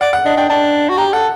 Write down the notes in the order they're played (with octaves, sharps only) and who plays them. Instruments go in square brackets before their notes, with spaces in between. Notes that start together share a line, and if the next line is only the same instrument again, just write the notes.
[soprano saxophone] D5 [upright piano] F#5
[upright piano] F#5
[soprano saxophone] D4 [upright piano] D#5
[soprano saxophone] D4 [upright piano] G5
[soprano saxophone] D4 [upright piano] A5
[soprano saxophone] F#4
[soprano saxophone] G4 [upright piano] A#5
[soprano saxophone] A4 [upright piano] F#5